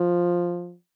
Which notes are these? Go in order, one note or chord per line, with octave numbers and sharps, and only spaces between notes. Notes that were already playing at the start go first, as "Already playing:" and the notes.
Already playing: F3